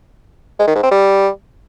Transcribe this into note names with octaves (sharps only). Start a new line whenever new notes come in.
G#3
D#3
G#2
C4
G3